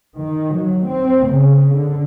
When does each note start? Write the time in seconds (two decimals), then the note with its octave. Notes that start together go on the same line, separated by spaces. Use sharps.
0.19 D#3
0.56 F#3
0.88 C4
1.30 C#3
1.75 D3